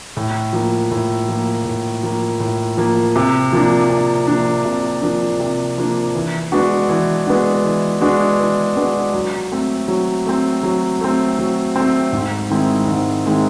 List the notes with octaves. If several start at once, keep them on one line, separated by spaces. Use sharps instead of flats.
A2
F3 A#3
A2
F3 A#3
A2
F3 A#3
A2
F3 A#3
C3
F3 A#3 D4
C3
F3 A#3 D4
C3
F3 A#3 D4
C3
F3 A#3 D4
E3
G#3 B3 D4 F#4
E3
G#3 B3 D4 F#4
E3
G#3 B3 D4 F#4
E3
G#3 B3 D4 F#4
F#3
A3 C4
F#3
A3 C4
F#3
A3 C4
F#3
A3 C4
G#2
D#3 G#3 C4 E4
G#2
D#3 G#3 C4 E4